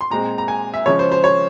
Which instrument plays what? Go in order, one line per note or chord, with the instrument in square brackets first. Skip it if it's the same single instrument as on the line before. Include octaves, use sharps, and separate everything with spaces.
[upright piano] C6
A#2 G#3 C4 A#5
A#5
G#5
E5
C#3 F3 G#3 C#4 C#5
C5
C5
C#5